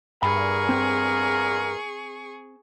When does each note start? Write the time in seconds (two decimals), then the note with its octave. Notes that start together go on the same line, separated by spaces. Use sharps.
0.23 E2 G2 A#2 G#4 A#4 B5 C#6
0.69 C4